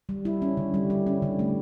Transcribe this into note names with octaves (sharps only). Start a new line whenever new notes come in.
G3
E4
C#4
D3
G3
E4
C#4
D3
A3